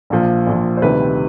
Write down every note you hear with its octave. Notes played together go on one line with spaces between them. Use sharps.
A#1 A#2 F3
A#1 A#2 F3
C5
D2 C3 D#3 G3 B4